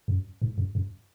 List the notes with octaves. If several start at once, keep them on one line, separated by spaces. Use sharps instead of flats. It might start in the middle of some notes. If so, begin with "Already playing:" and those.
F#2
G#2
F#2
F#2